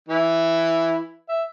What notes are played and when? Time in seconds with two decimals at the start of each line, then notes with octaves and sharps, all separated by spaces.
0.09 E3 E4
1.29 E5